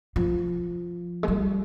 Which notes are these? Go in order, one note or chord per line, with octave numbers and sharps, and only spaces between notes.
F3
G#3
G3